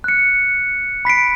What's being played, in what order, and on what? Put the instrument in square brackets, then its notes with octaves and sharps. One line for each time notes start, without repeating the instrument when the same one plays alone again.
[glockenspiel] F#6 C#7
B5 B6 C7 D7